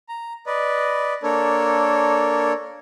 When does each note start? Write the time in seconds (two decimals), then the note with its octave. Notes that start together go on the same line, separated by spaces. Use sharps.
0.09 A#5
0.46 B4 D5 D#5
1.23 A#3 D4 A4 A#4 C#5